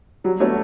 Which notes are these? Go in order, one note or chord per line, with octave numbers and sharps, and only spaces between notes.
F#3 G3
A3 B3 D4 F#4 C#5